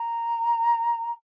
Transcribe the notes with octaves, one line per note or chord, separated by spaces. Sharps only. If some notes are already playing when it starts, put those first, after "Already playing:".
Already playing: A#5